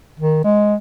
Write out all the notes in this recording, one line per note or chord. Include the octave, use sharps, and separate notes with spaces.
D#3
G#3